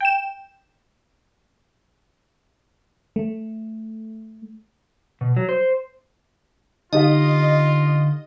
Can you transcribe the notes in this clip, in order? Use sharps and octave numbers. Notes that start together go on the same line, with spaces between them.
G5 E7
A3
B2
F#3
C5
D3 D#4 F4 G4 D#5 F5